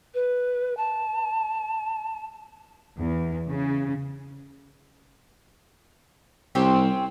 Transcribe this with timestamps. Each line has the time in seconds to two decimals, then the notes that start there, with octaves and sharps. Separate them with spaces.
0.14 B4
0.77 A5
2.97 E2
3.49 C#3
6.55 C2 C4 C#4 G4